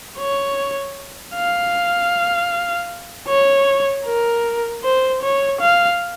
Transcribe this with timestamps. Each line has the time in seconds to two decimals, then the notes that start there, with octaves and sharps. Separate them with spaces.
0.19 C#5
1.35 F5
3.28 C#5
4.06 A#4
4.84 C5
5.22 C#5
5.61 F5